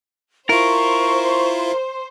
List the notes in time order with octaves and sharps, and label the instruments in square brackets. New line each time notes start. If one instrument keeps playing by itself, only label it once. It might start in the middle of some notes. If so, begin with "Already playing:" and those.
[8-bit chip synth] E4 F4 [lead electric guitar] A#4 [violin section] C5 [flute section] C#6